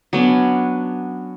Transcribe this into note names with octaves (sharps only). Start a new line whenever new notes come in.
F#3 B3 C#4 D4